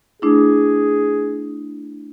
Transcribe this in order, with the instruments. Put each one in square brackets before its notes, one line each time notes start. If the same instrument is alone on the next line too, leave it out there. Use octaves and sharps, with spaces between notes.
[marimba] A3 D4 E4 [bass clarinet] G#4